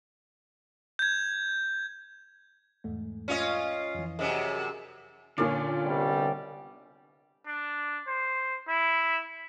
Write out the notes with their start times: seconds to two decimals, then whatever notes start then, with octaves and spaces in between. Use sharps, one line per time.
0.99 G6 G#6
2.84 E2 G#2 A3
3.28 C#4 F4 D#5
3.95 F2 E3
4.19 F#2 C3 G#4 D#5
5.38 A#2 D3 A#3 C#4 F4 D5
5.85 C2 B2 G3
7.47 D4
8.07 C5
8.68 E4